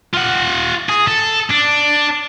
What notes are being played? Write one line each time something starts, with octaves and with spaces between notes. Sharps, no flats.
F4 F#5
G#4
A4
D4